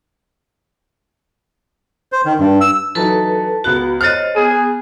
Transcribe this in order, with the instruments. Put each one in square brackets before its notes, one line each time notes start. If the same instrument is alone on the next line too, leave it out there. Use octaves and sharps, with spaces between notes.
[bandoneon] C5
D#3
G2
E6
[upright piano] E3 F#3 D#4 [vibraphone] A4 B4 A5
[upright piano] C#2 B3 F#6 [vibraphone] F#4
[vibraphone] C5 C#5 D#5 [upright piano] F6 F#6 A6
[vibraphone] B3 [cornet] G#4